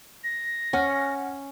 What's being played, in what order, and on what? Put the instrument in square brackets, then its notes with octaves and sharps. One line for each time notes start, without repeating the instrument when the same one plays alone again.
[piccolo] A#6
[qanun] C#4 [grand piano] F#5 F6